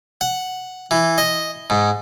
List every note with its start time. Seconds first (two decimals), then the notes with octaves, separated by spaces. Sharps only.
0.21 F#5
0.91 E3
1.18 D#5
1.70 G#2